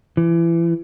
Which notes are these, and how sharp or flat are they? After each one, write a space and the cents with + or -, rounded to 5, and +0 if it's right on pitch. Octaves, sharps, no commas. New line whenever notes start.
E3 +30